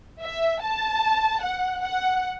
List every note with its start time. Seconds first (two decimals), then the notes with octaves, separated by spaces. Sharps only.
0.21 E5
0.61 A5
1.42 F#5
1.83 F#5